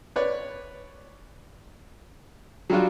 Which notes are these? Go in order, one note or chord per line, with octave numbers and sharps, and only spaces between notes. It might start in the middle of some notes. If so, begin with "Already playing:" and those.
B4 C#5 D5
F#3 G3 D4 F4 F#4